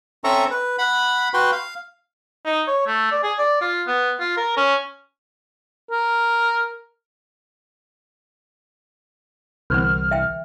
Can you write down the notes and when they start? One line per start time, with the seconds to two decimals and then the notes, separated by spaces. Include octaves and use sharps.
0.24 C4 C#4 A4 E5 A#5 C#6
0.50 B4
0.78 F#5 B5
1.34 F#4 B4 G5 C6
1.52 F5
2.45 D#4
2.67 C#5
2.87 A3
3.12 D5
3.23 G#4
3.39 D5
3.61 F4
3.87 B3
4.20 F4
4.37 A#4
4.57 C#4
5.91 A#4
9.70 C2 D3 E3 B3 F6
10.11 E5 G5